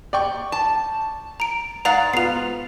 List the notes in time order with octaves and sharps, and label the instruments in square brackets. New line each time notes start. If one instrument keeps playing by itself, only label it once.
[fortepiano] D5 G5 C#6
[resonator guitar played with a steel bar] A5
[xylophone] A#5 D7
[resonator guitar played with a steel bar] G#2 D5 F#5 [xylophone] F5 A#5
[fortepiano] B3 F4 [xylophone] C7 F7